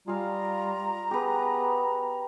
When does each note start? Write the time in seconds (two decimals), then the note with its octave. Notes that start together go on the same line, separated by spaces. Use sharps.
0.08 G3 F4 G#4 F5 A#5
1.11 B3 G4 G#4 B4